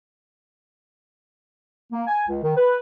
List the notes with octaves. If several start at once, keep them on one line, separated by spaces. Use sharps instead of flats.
A#3
G#5
C#2
D#3
B4